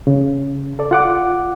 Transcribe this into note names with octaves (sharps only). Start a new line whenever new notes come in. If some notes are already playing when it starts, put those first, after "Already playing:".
C#3
A4 D5
F4 F#5 D6